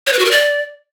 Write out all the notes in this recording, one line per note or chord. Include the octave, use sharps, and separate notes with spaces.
C#5
B4
F#4
A#4
D5